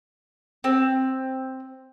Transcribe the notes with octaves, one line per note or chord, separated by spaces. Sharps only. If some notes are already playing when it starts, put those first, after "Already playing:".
C4